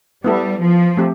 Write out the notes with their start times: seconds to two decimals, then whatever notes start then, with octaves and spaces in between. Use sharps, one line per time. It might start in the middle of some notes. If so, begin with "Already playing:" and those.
0.24 G3 B3 E4 A4
0.61 F3
0.97 A3 C4 G4